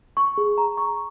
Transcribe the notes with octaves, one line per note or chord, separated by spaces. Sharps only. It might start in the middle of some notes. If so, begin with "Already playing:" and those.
C#6
G#4
A#5
C#6